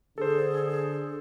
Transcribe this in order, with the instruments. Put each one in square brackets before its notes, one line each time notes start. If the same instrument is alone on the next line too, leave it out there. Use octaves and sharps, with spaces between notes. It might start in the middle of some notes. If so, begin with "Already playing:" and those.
[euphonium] D3 [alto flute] G#4 [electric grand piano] A4 C5